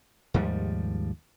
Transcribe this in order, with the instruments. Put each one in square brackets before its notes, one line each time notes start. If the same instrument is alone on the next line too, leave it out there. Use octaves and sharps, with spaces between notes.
[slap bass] D#2 G#2 F3 G3